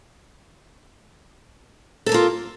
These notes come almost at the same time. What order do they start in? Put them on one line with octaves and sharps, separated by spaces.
A4 A#4 A#3 F4